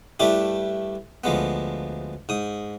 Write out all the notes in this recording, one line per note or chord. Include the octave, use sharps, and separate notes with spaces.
G2 A3 D4 E4 G4
D2 F3 G#3 B3
G#2 D#6